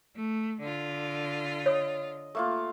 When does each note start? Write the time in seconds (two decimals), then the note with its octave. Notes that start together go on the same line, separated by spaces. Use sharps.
0.15 A3
0.62 D3 F4
1.66 C#5 D#5 D#6
2.35 A3 A#3 F4